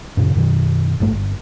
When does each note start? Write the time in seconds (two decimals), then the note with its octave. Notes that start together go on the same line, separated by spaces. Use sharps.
0.17 F#2 A#2 C#3
0.35 F#2 B2 D#3
1.00 A1 G2 A3
1.12 G1